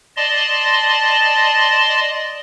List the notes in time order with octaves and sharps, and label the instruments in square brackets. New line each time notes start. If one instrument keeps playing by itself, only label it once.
[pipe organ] D5 D#5 A5 C6